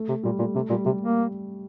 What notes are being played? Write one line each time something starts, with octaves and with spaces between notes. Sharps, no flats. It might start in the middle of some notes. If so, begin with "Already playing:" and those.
Already playing: A3
C3
A#2 G3
A#2 A3
C3 A3
A#2 G3
C3 G3
A#3